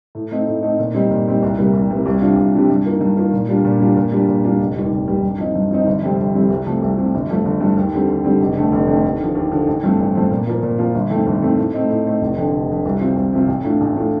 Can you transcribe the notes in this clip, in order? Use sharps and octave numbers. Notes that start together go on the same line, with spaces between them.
A2
A3 C4 D#4
A2
A3 C4 D#4
A#2
G3 C4 D#4
A#2
G3 C4 D#4
C2
C3 G3 A#3
C2
C3 G3 A#3
C2
C3 G3 D4 F4
C2
C3 G3 D4 F4
G2
D#3 A#3 F4
G2
D#3 A#3 F4
A#2
G3 D4 F4
A#2
G3 D4 F4
A#2
G3 D4 F4
A#2
G3 D4 F4
F1
D#2 D#3 G3
F1
D#2 D#3 G3
G2
F3 C4 D#4
G2
F3 C4 D#4
G1
F2 C3 G3 C4
G1
F2 C3 G3 C4
C2
C3 F3 A3
C2
C3 F3 A3
G1
G2 F3 A3
G1
G2 F3 A3
D#2
D3 G3 C4
D#2
D3 G3 C4
F1
F2 D3 A3
F1
F2 D3 A3
D#2
D3 F3
D#2
D3 F3
A1
G2 F3 A3 C4
A1
G2 F3 A3 C4
A#2
F3 A#3 F4
A#2
F3 A#3 F4
G1
F2 D#3 A3 C4
G1
F2 D#3 A3 C4
A2
A3 C4 D#4
A2
A3 C4 D#4
F1
F2 D3
F1
F2 D3
C2
C3 F3 C4 F4
C2
C3 F3 C4 F4
A1
A2 A3 D4 F4
A1
A2 A3 D4 F4